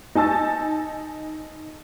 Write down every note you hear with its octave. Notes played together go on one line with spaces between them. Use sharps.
D#4 G#5 A5 E6 A6